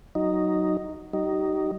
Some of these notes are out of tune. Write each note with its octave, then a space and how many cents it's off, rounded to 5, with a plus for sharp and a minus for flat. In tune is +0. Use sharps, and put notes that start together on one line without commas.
F#3 +10 D#4 +0
G3 -40 D#4 +0